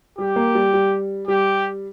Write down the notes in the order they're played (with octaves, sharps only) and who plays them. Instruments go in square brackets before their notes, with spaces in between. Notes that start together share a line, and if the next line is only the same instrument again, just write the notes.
[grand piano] G3 [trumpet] G4
[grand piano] A#3
G3
G3
[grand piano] G3 [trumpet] G4